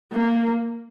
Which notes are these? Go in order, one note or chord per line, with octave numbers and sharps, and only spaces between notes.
A#3